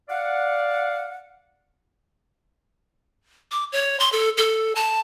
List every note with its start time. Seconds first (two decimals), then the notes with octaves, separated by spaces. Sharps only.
0.09 D5 F5 F#5
3.51 D6
3.72 C#5
4.00 C6
4.12 A4
4.37 A4
4.75 A5